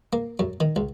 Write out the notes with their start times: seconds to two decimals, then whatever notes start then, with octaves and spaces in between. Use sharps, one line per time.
0.13 A#3
0.39 F#2
0.60 D#3
0.76 C#2